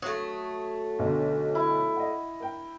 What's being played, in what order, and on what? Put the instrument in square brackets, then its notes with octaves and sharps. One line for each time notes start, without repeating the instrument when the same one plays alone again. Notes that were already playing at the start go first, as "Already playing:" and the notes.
[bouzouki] F#3 A3 [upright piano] C#6 D#6 G#6
[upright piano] B1 B2 D3
[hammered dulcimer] E4
[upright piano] D#5 F#5
A#4 G5